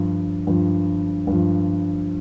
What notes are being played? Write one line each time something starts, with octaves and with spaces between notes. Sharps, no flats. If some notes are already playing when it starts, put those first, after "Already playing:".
Already playing: G2 F3
G2 F3
G2
F3